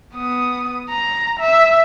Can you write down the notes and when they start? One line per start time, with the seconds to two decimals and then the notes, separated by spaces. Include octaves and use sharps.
0.15 B3 D#6
0.90 A#5
1.40 E5